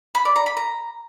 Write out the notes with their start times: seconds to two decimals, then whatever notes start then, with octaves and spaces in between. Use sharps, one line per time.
0.15 B5
0.25 D5
0.36 A#5
0.46 B5
0.57 A#5